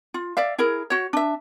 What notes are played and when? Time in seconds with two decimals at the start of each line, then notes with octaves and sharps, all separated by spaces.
0.14 F4
0.37 D5 E5 F5
0.58 E4 G#4 A#4
0.90 F#4 C#5
1.13 D4 E5